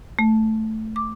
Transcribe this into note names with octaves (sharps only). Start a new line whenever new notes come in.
A3
D6